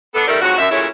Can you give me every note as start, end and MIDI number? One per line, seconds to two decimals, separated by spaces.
0.14 0.24 59
0.14 0.24 62
0.14 0.24 69
0.27 0.39 51
0.27 0.39 53
0.27 0.39 55
0.27 0.39 57
0.27 0.39 69
0.27 0.39 70
0.42 0.55 41
0.42 0.55 44
0.42 0.55 54
0.42 0.55 66
0.58 0.66 42
0.58 0.66 76
0.71 0.87 46
0.71 0.87 49
0.71 0.87 54
0.71 0.87 57
0.71 0.87 61
0.71 0.87 64